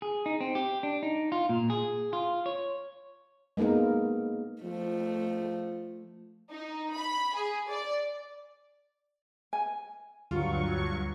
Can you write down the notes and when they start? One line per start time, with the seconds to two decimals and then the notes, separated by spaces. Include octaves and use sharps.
0.02 G#4
0.26 D#4
0.41 C4
0.55 G4
0.83 D4
1.03 D#4
1.32 F4
1.49 A#2
1.70 G#4
2.13 F4
2.46 C#5
3.57 G#3 A#3 B3 D#4 A#4
4.63 F3 A3
6.51 D#4
6.95 B5
7.35 G#4
7.69 D5
9.53 G#5
10.31 D2 G2 F#3 G3 F4 C#6